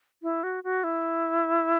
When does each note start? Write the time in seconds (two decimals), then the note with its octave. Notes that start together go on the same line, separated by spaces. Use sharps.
0.23 E4
0.43 F#4
0.64 F#4
0.84 E4